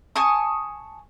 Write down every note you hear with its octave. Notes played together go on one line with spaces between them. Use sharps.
G#5 A5 C#6 D#6